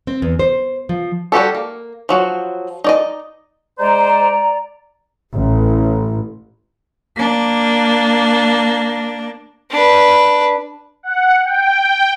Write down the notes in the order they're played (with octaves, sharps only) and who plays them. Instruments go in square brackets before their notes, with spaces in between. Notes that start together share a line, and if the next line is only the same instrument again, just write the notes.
[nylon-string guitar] C4
E2
C5
F3
[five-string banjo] G3 F#4 G4 A4
A#3
F3 F#3 F#4
D#4 D5 D#5
[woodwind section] G#3 C5 [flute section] D5 A#5
[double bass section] A1
[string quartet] A#3 D4
[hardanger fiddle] D4 B4
[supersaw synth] F#5
G5